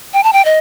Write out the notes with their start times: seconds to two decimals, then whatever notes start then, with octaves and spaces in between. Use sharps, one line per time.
0.14 G5
0.24 A5
0.33 G5
0.45 D#5